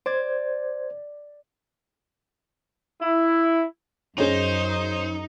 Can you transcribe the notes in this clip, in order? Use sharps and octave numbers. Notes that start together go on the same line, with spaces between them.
C5 D5 G#6
E4
F#2 C#4 D#4 G#4 C5 C#5